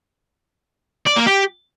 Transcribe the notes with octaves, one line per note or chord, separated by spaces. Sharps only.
D5
A#3
G4